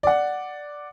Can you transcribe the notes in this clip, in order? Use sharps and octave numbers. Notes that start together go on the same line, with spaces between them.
D5 F#5